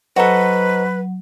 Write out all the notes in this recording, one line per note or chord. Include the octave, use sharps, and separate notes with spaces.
F#3 F#4 A4 B4 C5 D#5 A#5